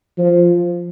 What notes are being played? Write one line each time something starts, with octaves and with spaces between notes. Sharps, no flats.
F3